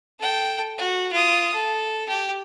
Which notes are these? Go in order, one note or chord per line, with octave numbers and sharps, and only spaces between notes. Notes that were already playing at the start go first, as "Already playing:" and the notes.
A4 G5
F#4
F4 D#6
A4
G4